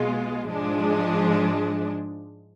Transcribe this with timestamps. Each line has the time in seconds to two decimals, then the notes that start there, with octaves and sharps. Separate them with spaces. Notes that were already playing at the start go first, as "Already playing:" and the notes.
Already playing: B1 B2 G#3 B3 F4
0.49 G#2 F3 G#3 D4